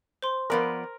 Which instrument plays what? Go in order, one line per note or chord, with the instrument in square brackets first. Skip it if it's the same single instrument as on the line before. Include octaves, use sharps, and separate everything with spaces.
[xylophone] C5 C6
[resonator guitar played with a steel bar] F3 B3 D5 [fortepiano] A#4